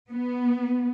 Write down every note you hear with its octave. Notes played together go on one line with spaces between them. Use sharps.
B3